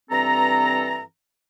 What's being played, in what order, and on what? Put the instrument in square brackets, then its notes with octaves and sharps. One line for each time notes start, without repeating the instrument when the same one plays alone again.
[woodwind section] G2 E3 C4 A4 A#5